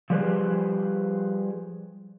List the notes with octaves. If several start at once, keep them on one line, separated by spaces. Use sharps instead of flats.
F3 G3 G4 G#4 B4 C5